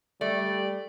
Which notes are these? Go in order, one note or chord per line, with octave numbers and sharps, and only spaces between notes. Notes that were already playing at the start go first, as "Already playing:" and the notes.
G3 A3 D5